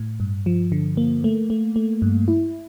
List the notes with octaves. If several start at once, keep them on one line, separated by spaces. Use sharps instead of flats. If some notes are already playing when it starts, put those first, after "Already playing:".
Already playing: A2
G2
F3
D3
A#3
A3
A3
A3
G2
E4